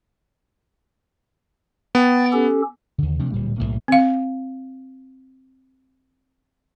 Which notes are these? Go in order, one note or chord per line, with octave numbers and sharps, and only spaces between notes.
B3 G5 A6
C#4 G4 A4
D#2 D3
C3 F3 A3 D4
D1 A#2 G3
B1 F2 A2 A#3
C4 F5